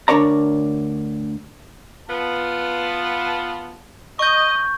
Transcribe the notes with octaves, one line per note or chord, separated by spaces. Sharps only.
D2 D4 A#4 C#5 D5 A#5
B3 F4 A5
D#5 C#6 G6